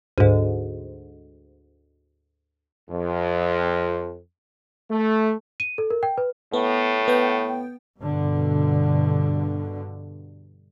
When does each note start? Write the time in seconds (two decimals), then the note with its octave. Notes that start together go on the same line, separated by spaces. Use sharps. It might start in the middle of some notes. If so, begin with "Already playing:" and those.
0.18 D2 G#2
2.90 F2
4.91 A3
5.60 D#7
5.78 A4
5.91 A#4
6.03 G5
6.18 B4
6.53 A2 B3
7.08 B3 G5
7.99 G2 B2 D3